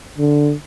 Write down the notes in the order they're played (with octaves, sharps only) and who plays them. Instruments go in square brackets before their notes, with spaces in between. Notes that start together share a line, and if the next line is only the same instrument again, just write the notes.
[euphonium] D3